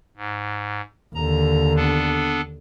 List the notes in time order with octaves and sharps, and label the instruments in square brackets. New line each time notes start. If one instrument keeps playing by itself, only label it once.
[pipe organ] G#2
[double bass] D#2 D3 [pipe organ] A#5
[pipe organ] B3 D4 A4